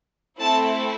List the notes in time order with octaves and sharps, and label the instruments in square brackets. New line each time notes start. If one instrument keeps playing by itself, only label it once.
[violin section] A3 C4 E4 A5